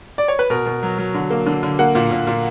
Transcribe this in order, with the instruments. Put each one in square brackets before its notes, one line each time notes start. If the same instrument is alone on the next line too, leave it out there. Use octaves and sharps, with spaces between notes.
[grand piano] D5
C#5
B4
B2 A#4
B2
F#3
F#3
D3
A#3
D3
D3
A#3 F#5
A#2
A#2
A#2